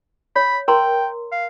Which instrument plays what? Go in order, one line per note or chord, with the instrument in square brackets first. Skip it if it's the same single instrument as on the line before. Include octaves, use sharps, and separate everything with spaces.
[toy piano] C#5 [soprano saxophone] B5
[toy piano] A#4 A#5 C6 [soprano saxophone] G5
[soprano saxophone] F5